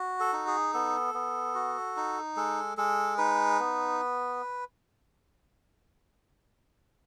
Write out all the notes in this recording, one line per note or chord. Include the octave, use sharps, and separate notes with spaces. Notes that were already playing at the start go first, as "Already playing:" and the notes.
Already playing: F#4
A4
D#4
G#4
B3 A4
B3
F#4
D#4
G#3 A4
G#3 A4
D#4 B4
B3